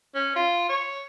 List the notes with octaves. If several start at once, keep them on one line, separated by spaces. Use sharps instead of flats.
C#4
F4
C#5